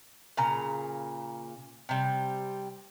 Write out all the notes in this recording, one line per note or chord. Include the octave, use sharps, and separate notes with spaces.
A#2 C#3 A#5
C3 G3